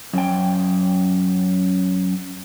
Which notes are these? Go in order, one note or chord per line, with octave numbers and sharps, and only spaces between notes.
F#2 G5